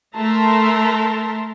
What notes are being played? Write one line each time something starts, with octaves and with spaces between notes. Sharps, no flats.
A3 A#4 E5 A5 A#5 C6